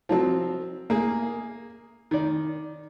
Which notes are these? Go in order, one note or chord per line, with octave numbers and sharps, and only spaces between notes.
F3 F#3 C4
A#3 G#4
D#3 D5